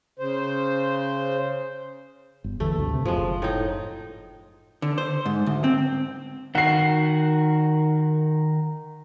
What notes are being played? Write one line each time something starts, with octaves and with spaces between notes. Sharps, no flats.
C#3 C5
G1
D#2 D3 E3 A3
D2 G2 C3
C3
F#1 F3 G#3
A2 D#4
D3
C5
G#2
D2
C4
D#3 F#4 F#5 C7